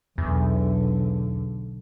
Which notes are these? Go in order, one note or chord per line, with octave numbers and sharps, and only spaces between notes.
B1 E2 D3